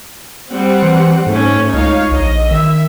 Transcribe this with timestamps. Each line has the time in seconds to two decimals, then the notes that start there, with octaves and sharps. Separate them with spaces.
0.51 G3 C4 F#5
0.82 E3
1.27 G#2 A3 C#4
1.74 C#2 D#4 C#5 F5
2.12 A#1 D#5
2.51 D#3 E5